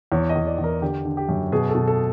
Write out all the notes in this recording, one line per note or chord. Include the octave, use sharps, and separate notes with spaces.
E2 C#5
D#5
E2
D5
E2
A#4
D3 G4
D3
G4
F#2
B2 G#4
A4
B2
A4